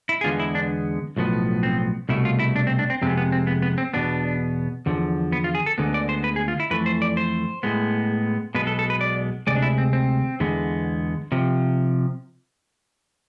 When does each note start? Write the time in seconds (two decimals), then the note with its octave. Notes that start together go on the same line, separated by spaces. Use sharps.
0.09 E4
0.21 G#4
0.24 E2 D3 G#3 B3 F4
0.40 E4
0.55 D4
1.16 B1 A2 F3 B3
1.63 C4
2.09 C2 B2 A3 E4
2.25 F4
2.39 E4
2.56 D4
2.67 C4
2.79 D4
2.90 C4
3.02 F2 C3 G#3 B3 C4
3.17 B3
3.32 C4
3.47 B3
3.62 B3
3.78 C4
3.94 E2 B2 B3 D4
4.86 E2 D3 F3
5.32 B3
5.44 F4
5.55 G#4
5.66 A4
5.78 D2 D3 G#3 B3
5.94 D5
6.09 C5
6.24 B4
6.36 G#4
6.48 F4
6.60 E4
6.71 F2 E3 A3 B4
6.86 C5
7.02 D5
7.17 C5
7.63 A2 G#3 B3
8.55 B1 B2 G#3 B3 B4
8.67 A4
8.79 A4
8.90 B4
9.01 D5
9.47 D2 C3 G#3 D5
9.56 D4
9.62 E4
9.78 C4
9.93 C4
10.40 E2 D3 G#3 B3
11.32 C3 F3